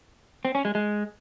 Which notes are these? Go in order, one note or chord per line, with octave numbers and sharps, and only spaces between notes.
C4
C#4
G#3
G#3